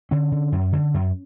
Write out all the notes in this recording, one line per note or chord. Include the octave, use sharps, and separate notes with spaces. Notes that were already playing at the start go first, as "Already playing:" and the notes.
D3 C#4
D3
F#2
D3
F#2